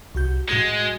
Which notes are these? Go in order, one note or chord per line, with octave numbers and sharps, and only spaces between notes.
C2 F#4 G6
A2 G#3 F#4 G#6